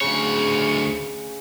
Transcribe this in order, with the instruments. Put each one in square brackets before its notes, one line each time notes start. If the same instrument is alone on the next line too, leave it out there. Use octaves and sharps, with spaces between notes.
[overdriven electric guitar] D2 C#5 [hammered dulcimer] C#3